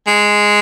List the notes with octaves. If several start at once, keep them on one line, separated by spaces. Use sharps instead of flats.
G#3